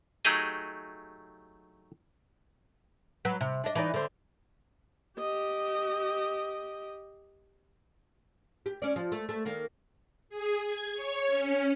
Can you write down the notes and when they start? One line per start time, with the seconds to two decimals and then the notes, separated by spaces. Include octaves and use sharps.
0.25 F#3 A3 D#4 G4 G#4 D#5
3.25 F#3 B4
3.41 C3
3.64 D4 D#5
3.75 E3 D#4 D5
3.94 D3 C4
5.19 G4 D#5
8.66 G4
8.82 C#4 D5
8.96 F3
9.12 A3
9.29 A3
9.45 D#3 A#3
10.29 G#4
10.62 G#6
10.94 C#5
11.28 C#4